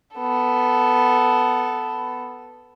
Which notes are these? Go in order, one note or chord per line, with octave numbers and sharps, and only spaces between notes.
B3 A4